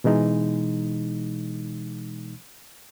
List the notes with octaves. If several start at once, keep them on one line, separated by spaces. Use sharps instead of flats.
B2 E3 G#3 D#4